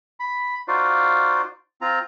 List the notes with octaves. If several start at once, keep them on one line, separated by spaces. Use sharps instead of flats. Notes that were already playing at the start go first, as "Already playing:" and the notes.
B5
D#4 F4 F#4 C5 D5 F5
C4 F4 A#5